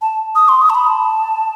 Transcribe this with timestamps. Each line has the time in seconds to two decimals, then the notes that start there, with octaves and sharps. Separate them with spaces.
0.02 A5
0.35 D#6
0.49 C6
0.62 D#6
0.70 A5
0.75 B5
0.87 A5